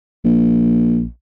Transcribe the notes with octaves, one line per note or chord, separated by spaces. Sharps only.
A#1